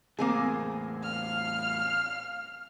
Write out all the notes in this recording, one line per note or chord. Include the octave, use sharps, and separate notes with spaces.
E2 A2 A#3 C4 G#4 G#5
F5 F6